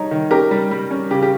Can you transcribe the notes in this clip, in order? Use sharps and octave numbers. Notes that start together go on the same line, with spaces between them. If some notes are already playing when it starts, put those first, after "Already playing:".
Already playing: G3 D#4 C#5 A#5
D#3
C#4 G4 A#4
G3
G3
C#4
C#3 G4
G4